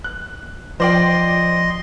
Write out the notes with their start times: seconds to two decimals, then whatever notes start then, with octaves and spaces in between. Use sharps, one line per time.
0.04 F#6
0.80 F3 C5 D5 D#5 G5 C6